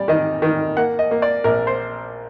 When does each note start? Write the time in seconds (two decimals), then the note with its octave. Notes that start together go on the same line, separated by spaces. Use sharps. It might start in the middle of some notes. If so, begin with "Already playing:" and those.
Already playing: G3 D5
0.08 D#3 D#5
0.42 D#3
0.77 A#3 F#5
0.99 D#5
1.11 A#3
1.22 D5
1.44 A#1 A#4
1.67 C5